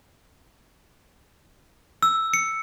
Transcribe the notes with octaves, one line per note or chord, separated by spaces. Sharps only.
E6
C#7